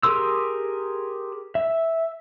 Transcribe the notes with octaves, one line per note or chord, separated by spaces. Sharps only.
G4 G#4 A#4 C6 E6
E5